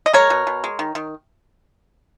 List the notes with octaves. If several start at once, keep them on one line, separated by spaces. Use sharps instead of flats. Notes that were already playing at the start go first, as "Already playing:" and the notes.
D#5
G#3 A#4 C#5
B2
B2
G#3
D#3
D#3